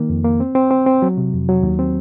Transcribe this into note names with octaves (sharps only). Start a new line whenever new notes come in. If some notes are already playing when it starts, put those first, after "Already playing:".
Already playing: D#3 A#3
F2
A#3
C4
C4
C4
C4
F#3
C3
F2
F#3
D#2
C4